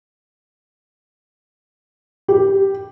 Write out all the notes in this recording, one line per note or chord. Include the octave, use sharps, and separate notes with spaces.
G4